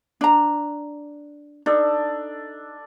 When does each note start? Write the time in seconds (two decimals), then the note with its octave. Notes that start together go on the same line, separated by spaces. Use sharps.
0.21 D4 A#5
1.66 D4 D#4 A4 D5